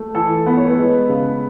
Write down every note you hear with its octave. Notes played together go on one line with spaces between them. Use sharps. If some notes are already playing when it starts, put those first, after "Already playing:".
Already playing: A3
E3 A4
B3 B4
C#5
B4
G#3
C#3